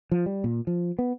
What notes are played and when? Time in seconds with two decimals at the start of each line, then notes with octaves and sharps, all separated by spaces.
0.12 F3
0.26 G3
0.44 A#2
0.67 F3
0.99 B3